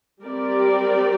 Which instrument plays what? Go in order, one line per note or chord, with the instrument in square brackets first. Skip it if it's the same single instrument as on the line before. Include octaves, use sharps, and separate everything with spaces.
[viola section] G3 C4 G4 A#4 D5